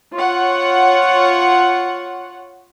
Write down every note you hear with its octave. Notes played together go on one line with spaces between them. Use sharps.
F4 C#5 F#5